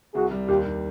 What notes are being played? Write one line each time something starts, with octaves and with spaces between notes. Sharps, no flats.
C2 F#4 G#4
G3
D#2 F4 G4
D#2